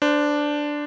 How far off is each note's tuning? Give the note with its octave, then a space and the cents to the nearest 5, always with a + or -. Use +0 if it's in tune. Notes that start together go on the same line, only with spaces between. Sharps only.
D4 +0 C5 -25